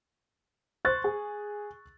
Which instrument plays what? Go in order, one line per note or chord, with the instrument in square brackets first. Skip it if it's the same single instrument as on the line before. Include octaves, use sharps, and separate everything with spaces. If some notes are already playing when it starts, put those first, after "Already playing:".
[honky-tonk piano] C5 [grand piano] C#6 F#6 A6
[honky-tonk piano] G#4